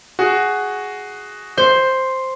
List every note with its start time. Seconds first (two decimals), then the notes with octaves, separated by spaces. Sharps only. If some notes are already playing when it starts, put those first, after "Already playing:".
0.19 F#4 G#4
1.57 C5